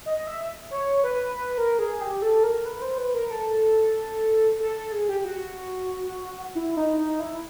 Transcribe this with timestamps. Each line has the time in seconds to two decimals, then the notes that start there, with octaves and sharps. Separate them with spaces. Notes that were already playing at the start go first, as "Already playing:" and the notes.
0.06 D#5
0.27 E5
0.71 C#5
1.04 B4
1.36 B4
1.58 A#4
1.79 G#4
2.01 G4
2.22 A4
2.43 A#4
2.66 B4
2.82 C5
2.98 B4
3.14 A#4
3.30 A4
4.60 A4
4.76 A4
4.92 G#4
5.09 G4
5.25 F#4
6.55 E4
6.77 D#4
6.98 D#4
7.20 E4